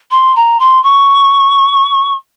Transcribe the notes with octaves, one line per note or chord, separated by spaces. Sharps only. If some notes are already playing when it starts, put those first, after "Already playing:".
C6
A#5
C6
C#6